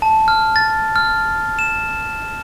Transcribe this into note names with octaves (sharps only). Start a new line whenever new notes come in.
A5
F6
A6
F6
E7